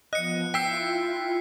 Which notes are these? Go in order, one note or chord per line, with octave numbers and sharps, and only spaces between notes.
F3 B3 D#5 F#6 C#7
E4 F4 G5 E6 B6 C7